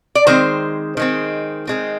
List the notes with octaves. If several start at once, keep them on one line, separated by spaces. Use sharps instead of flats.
D5
D#3 G#3 C4 C5
D#3 G#3 C4
D#3 G#3 C4